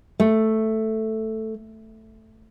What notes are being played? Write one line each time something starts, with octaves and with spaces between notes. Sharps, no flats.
A3